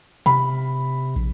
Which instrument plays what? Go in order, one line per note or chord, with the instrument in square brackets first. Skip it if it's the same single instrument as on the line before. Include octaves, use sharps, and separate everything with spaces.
[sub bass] C3 [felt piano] B5
[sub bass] A#1